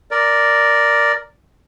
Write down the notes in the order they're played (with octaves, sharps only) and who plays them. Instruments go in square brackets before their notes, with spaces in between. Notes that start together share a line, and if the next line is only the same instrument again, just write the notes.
[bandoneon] A#4 D5